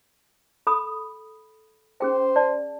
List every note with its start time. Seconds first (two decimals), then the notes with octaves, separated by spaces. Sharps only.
0.67 A4 B5 D#6
2.01 C#4 G#4 C5 G5
2.36 D5 A5